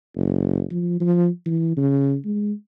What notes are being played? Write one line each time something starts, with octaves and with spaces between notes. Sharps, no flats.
F#1
F3
F3
E3
C#3
G#3